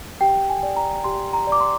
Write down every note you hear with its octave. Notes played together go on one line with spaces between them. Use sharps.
G4 G5
G#5
D5
A#5
G4 C6
A#5
D5 D6
C6